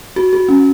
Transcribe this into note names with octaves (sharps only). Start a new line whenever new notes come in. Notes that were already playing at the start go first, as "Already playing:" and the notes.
F#4
F#4
C#4